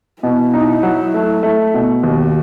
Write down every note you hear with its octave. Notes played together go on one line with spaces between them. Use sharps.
B2 E4
D#4
F#3
A3
A3
B2
D#2 F#4